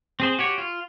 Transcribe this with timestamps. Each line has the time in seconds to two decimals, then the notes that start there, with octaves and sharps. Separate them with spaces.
0.20 C4 G#4 C5
0.39 F#4 G4 C#5
0.58 F4